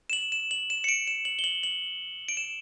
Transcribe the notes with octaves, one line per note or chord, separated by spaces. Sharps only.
E7
F#7
E7
F#7
E7
C#7
D7
E7
F#7
G7
F#7
F#7
D7
E7